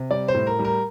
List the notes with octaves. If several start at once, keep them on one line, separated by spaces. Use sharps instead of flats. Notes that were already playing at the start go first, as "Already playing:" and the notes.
Already playing: C3
G3 D5
C5
A2
A#4
G3
A#4